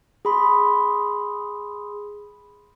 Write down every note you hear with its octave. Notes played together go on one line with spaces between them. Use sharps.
G#4 B5 C6